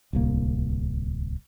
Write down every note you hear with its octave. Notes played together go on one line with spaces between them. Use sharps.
D1 C2 A#3